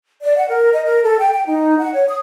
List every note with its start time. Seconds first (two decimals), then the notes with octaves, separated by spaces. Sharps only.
0.23 D5
0.36 F#5
0.49 A#4
0.73 D#5
0.85 A#4
1.03 A4
1.20 G5
1.34 G5
1.46 D#4
1.78 F#5
1.94 C#5
2.08 D#6